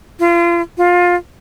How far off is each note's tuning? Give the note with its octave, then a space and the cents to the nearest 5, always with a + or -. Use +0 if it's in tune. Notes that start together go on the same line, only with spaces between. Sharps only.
F4 -35
F4 +20